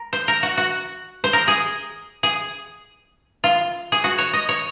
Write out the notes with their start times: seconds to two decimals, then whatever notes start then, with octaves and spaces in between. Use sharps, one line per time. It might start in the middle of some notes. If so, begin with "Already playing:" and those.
Already playing: A#4
0.13 C5
0.28 A#4
0.43 F#4
0.57 F#4
1.24 C5
1.33 A#4
1.48 G#4
2.23 G#4
3.44 F4
3.92 G#4
4.04 F#4
4.18 C#5
4.33 D#5
4.49 C#5